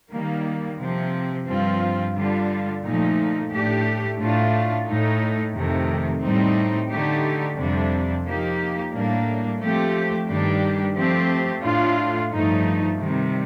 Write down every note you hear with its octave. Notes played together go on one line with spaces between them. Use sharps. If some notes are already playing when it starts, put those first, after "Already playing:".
D#3 G3 A#3
C3 F3 C4
G2 F3 C4 F4
D3 G3 D4 F4
A#2 F3 A3 D#4
A2 A3 D4 G4
A2 A3 D4 F4
A2 A3 D#4
F2 C3 D#3 A3
A2 G3 C4 D#4
D3 A3 D#4 G4
F2 C3 G3 D4
F3 A#3 D#4 G4
A2 G3 A#3 D4
F3 A3 C4 G4
G2 D#3 G3 D4 G4
F3 A3 C4 G4
A2 A3 D4 F4
G2 F3 A3 D#4
C3 D#3 G3